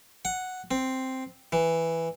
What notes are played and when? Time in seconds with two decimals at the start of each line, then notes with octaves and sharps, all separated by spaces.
0.25 F#5
0.71 C4
1.52 E3